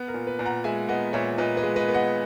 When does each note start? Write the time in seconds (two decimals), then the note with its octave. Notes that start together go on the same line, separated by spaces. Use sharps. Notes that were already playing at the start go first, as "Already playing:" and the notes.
Already playing: B3
0.08 A#4
0.14 A#2
0.27 B4
0.39 A#2
0.45 F#5 A#5
0.64 G#3 E5 G#5
0.89 B3 D#5 F#5
1.13 A#2 C#5 E5
1.38 A#2 B4 D#5
1.57 B4 D#5
1.63 G#3
1.76 B4 D#5
1.88 B3
1.94 D#5 F#5